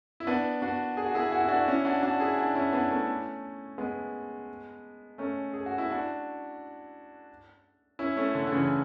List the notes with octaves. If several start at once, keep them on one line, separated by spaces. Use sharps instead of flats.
E4
B3 D4
D4 F#4
G#4
F#4
E4 G#4
F#4
E4
D4 F#4
F#4
C#4 E4
D4 F#4
D4 F#4
E4 G#4
D4 F#4
C#4 E4
B3 D4
A3 C#4
G#3 B3
A3 C#4
G#4
F#4
E4
D4 F#4
C#4 E4
A3 C#4
D3
D3
C#3 E3